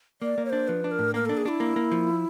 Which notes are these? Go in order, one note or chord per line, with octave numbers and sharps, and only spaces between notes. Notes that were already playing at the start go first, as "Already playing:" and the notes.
A#3 D5
A#3
C#5
D4 C5
F3 B4
D4
A#4
A2
A#3 A#4
D4 A4
G#4
D4 E4
A#3
A#3
F3